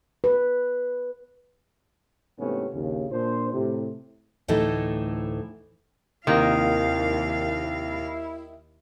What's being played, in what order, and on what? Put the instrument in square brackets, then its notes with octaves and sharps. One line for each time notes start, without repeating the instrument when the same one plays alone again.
[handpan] B4
[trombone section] G#2 C3 E3 A3 B3 C#4
A#1 D#2 C#3
A#2 D4 C5
A2 C3
[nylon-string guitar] D2 A2 E3 D#4 E4 A4
[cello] D#2 F5 [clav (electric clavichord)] C3 A#3 [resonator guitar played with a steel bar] D#3 [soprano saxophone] E4